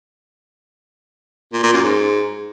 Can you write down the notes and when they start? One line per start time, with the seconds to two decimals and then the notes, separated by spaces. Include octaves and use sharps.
1.53 A#2
1.63 A#2
1.74 F#2
1.84 G#2